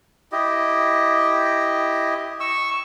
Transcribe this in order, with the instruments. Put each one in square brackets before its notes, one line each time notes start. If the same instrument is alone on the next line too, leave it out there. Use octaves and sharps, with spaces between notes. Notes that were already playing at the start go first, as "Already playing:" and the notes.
[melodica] E4 G4 D#5
C#6 E6